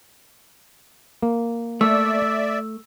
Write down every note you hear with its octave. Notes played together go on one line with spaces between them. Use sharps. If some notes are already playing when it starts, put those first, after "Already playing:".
A#3
A3 D5 E5 E6